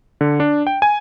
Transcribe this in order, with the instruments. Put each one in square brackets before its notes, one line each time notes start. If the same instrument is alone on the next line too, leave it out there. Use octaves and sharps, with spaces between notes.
[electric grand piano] D3
D4
G5
G#5